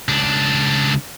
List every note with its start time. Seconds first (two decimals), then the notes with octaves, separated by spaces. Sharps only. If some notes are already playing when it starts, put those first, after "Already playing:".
0.08 C#2 D4